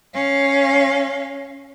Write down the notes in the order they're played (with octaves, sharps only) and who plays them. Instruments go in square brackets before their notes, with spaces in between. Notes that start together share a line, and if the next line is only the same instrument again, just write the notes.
[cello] C#4 F5